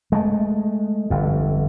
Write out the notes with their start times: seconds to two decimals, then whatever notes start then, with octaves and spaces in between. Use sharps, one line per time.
0.12 G#3 A3
1.10 G1 F2